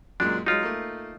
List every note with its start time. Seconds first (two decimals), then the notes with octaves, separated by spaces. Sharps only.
0.20 F#2 A#2 G#3 D4
0.46 F#3 G#3 D#4 F4
0.63 A3 A#3